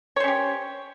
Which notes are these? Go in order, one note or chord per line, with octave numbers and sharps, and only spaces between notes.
C#4 G4 C5 C#5